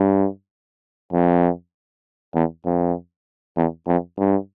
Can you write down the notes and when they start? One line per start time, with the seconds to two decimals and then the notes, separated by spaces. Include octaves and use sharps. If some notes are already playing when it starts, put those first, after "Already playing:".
Already playing: G2
1.13 F2
2.35 E2
2.65 F2
3.57 E2
3.87 F2
4.18 G2